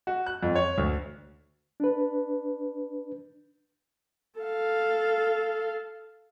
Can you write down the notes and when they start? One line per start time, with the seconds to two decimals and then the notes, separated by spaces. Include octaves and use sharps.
0.07 F#4
0.26 F#6
0.43 F2
0.55 C#5
0.78 D2
1.80 D4 B4
4.40 A4 F5